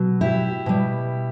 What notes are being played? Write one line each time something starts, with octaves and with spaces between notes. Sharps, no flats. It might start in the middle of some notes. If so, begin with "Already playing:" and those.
Already playing: B2 F#3
E4 G4
B2 G3